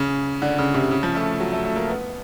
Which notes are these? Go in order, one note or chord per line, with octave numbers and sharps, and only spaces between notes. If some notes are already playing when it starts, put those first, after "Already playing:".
Already playing: C#3
D3
C#3
C3
C#3
F3
A3
F#3
A3
A3
A#3
B3